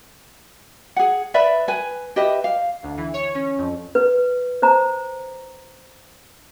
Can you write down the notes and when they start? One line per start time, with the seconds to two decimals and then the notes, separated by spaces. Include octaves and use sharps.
0.96 G#4 F#5
1.34 B4 D5 E5 B5
1.68 B4 G#5
2.16 G4 B4 D#5 E5
2.44 F5
2.83 D2
2.97 E3
3.14 C#5
3.35 C#4
3.58 F2
3.95 B4
4.62 C5 A#5